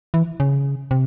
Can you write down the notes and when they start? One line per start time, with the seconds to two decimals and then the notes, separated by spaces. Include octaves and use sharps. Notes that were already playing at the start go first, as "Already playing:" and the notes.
0.14 E3
0.40 C#3
0.91 C3